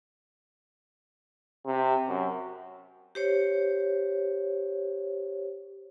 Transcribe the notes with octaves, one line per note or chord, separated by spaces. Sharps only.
C3
F#2
G4 C5 C#5